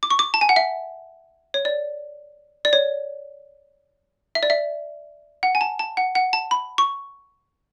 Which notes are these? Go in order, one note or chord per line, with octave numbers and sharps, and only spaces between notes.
D6
C#6
D6
A5
G#5
F#5
E5
C#5
D5
D5
C#5
E5
D5
E5
F#5
G#5
A5
A5
F#5
F#5
A5
B5
C#6